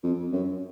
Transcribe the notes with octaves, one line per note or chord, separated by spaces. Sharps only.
F2
F#2